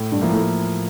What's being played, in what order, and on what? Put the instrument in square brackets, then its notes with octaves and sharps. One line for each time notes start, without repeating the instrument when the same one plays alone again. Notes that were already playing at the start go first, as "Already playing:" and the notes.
Already playing: [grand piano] A2
[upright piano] G2
[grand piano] F3 A#3 E4
[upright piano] A2